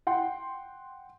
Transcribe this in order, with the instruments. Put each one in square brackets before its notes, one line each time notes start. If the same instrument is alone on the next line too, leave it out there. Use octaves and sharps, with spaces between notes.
[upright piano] F#5 G5 C6